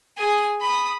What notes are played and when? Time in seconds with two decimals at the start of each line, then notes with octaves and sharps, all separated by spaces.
0.18 G#4 G#5
0.61 B5 D#6